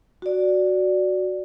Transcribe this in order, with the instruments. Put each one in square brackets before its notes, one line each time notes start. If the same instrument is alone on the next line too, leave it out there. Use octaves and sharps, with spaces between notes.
[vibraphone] F#4 D5